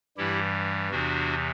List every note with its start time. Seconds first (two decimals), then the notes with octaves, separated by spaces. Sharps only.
0.17 G2 E3 G3 E4 G4
0.91 E2 C3 E3 D4 F#4